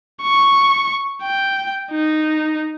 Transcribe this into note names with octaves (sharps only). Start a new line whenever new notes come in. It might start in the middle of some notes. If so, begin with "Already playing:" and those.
C#6
G5
D#4